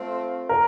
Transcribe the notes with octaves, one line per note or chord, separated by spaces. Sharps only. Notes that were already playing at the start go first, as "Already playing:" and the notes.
Already playing: A3 C4 F4
A#4